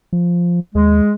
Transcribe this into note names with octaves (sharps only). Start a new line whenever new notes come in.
F3
D#2 G#3